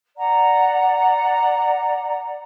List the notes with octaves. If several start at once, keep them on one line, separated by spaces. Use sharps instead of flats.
D5 F#5 A#5